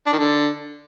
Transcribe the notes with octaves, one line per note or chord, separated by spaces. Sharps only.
D4
D#3
D3